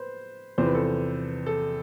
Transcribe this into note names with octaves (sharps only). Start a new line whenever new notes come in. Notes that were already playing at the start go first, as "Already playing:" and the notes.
Already playing: B4 C5
E2 C3 F3 C5
B4
A4
B4
A4